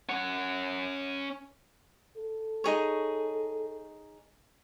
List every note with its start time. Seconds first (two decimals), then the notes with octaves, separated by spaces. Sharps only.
0.09 C#4 F#5
2.17 A4
2.64 D#4 G#4 C#5